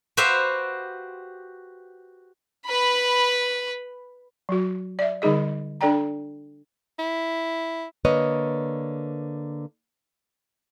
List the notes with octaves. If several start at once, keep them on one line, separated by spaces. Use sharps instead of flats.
F#4 G4 B4 C5 E5 F5
B4 B5
F#3 F#4
D5 E5
D3 G3 D#4 G#4 D#5
D4 A4 D5 G5 A#5
E4
D3 A#3 B4 C#5 D#5